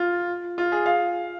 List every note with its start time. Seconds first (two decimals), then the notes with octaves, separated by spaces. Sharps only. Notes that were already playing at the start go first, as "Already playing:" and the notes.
Already playing: F4
0.58 F4
0.72 G#4
0.86 F5